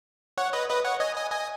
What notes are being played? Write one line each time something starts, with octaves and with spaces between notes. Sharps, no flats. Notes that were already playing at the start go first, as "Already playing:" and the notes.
C#5 F#5
B4 D#5
B4 D#5
C#5 F#5
D#5 G#5
D#5 G#5
D#5 G#5